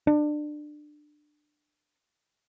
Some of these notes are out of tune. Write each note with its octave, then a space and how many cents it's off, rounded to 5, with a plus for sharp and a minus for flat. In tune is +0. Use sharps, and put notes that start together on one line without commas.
D4 +25